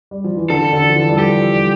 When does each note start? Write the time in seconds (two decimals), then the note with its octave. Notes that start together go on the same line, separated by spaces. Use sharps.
0.11 G3
0.24 F3
0.37 E3
0.50 D3 A4
0.73 D3
0.88 F3
0.96 E3
1.08 G3
1.18 F3 G4
1.52 G3